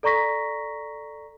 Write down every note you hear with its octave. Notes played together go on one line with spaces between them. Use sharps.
A4 D5 A#5 C#6 A#6 B6